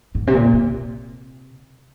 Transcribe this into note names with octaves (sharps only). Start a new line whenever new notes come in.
G#2
C3
A#2
C3